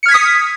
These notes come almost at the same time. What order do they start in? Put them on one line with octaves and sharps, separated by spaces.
C#7 F6 G#6 B6 D#6